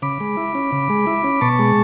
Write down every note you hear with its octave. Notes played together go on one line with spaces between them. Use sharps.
C#3 B5 D6
G#3
E4
C#4
C#3
G#3
E4
C#4
B2 A5 C#6
G#3